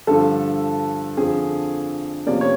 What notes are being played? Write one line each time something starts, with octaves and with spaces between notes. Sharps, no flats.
G2 D3 F3 A4
F2 D3 F3 G#4
E2 C3 F3 A#3 C#4 D5
C#5